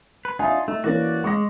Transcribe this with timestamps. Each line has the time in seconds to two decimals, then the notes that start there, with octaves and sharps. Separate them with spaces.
0.25 B4
0.39 D4 D#4 F4 E5 F#5 G#5
0.68 A3 D#4
0.84 E3 A#3 C#4 F#4 D5
1.24 G#3 C#6 D6 A#6